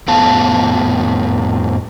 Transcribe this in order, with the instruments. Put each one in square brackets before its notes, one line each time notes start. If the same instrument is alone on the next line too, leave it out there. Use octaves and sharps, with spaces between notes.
[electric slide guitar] F2 A2 B3 F5 A5